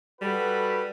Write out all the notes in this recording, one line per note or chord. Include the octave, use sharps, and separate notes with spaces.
G3 F#4 A4 B4